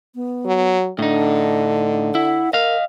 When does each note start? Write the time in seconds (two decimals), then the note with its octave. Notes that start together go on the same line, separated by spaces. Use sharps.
0.15 B3
0.46 F#3
0.99 A2 D3 D4 D#4
2.15 E4 F#5
2.53 A#4 D#5 F5